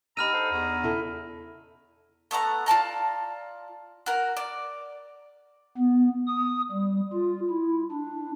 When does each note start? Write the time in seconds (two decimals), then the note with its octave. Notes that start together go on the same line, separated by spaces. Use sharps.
0.17 D4 D#4 G4 A#5 B5 E6 F6 D#7
0.33 A4 C5 F#5
0.52 E2 A#5
0.83 C#3 E4 A4
2.31 A3 B3 F#5 A#5
2.66 F4 D5 A5 A#5
4.06 F#4 A#4
4.37 D5
5.77 B3
6.27 D#6
6.71 G3
7.13 F4
7.50 E4
7.92 D4